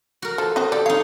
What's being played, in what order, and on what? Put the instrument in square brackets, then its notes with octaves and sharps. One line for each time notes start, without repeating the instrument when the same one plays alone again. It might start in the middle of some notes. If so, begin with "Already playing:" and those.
[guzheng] F#4 A#4
[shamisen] F3 [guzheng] A4
[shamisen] C4 F#4 C5 [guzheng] D#5
[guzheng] G4 A4 [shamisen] D5
[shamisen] C4 F5 [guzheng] D#4 C#5